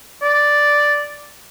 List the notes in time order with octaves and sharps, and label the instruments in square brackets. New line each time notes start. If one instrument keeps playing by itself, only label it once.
[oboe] D5